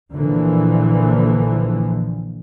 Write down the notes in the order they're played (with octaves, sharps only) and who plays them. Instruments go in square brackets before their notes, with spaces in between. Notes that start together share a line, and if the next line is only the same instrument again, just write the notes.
[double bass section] A#1 A#2 D3 E3 F3